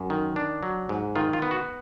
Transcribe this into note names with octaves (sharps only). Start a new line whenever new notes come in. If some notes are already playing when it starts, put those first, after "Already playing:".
Already playing: F#2
D#3
D4
F#3
G#2
D#3 F4
F4
B3
F#4